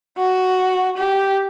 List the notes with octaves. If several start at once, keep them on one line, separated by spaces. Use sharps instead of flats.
F#4
G4